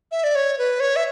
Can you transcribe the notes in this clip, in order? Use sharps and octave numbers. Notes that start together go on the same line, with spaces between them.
E5
D5
C#5
B4
C#5
E5